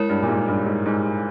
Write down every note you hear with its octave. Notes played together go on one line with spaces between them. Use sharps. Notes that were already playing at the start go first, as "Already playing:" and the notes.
Already playing: G#3 E4 A#4 C#5
G2
A#2
G#2
G2
G#2
G#2